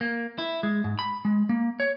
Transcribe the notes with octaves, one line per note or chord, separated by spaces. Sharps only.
A#3
E4
G#3
G#2
B5
G#3
A#3
C#5